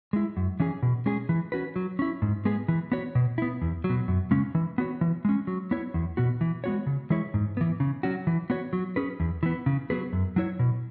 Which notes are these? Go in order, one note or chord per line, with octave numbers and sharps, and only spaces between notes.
G#3 E4
F#2
E3 C#4 G#4
B2
G#3 C#4 G#4
E3
C#4 F#4 B4
F#3
C#4 E4
G#2
G#3 B3 G#4
E3
B3 F#4 C#5
B2
B3 E4
E2
F#3
B2
F#2
C#3 G#3 C#4
E3
B3 F#4 C#5
E3
G#3 C#4
F#3
B3 E4 C#5
E2
B2 B3 F#4
E3
G#3 B3 F#4 C#5
C#3
E3 G#3 E4 C#5
G#2
E3 B3
C#3
F#3 C#4 F#4
E3
B3 F#4 C#5
F#3
C#4 G#4 B4
E2
E3 B3
C#3
F#3 B3 G#4 B4
F#2
F#3 E4 C#5
B2